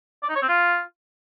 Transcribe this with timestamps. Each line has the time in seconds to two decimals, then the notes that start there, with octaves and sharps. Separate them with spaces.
0.23 D5
0.29 D#4
0.36 C#5
0.42 C4
0.49 F4